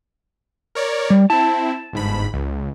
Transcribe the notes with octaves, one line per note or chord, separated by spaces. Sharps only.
A#4 C#5 D5
G3
C4 E4 A5
G1 G#2 B5
C#2